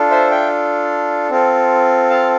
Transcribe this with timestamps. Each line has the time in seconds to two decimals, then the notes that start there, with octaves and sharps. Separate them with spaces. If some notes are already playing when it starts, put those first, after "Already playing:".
Already playing: D4 F4 A4
0.11 C5 E5
0.30 E5 G5
1.30 C4 F4 A4
2.10 F5 A5